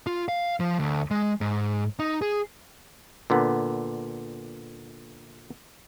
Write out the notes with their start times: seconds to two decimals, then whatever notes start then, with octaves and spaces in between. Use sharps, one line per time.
0.07 F4
0.29 F5
0.60 F3
0.79 D2
1.11 G#3
1.41 G#2
1.99 D#4
2.22 G#4
3.30 A#2 D3 B3